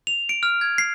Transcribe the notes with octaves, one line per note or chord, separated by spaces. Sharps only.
F7
D7
F6
G#6
C7